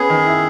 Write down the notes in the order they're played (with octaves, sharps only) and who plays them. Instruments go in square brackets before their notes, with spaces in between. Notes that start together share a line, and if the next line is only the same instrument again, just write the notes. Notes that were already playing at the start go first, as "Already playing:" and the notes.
Already playing: [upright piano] B3 C#4 [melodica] G#4
[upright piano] D#3
E4